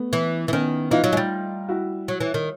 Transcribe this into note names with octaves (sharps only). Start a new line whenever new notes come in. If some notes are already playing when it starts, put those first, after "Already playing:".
Already playing: A3 B3
E3
E3
D#3 B3 C#4
E3 D#4 F4
F#3
G#3
G3
E4 F#4
F#3
E3
D#3